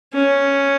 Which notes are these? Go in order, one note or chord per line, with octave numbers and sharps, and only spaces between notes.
C#4